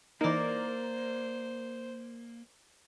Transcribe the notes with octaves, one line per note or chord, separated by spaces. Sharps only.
E3 A#3 D#4 A#4 C5 D5